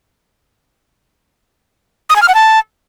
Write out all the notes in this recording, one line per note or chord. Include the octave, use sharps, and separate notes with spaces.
D#6
G#5
F6
F#5
A5